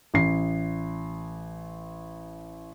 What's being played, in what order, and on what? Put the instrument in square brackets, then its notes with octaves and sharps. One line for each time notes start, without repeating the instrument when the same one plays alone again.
[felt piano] A1 C7